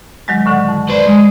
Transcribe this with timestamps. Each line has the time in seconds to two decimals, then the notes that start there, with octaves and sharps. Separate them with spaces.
0.28 D#3 F#3 G#3
0.46 A2 D3 F#5
0.68 F2
0.90 B4 C5 D5
1.07 G#3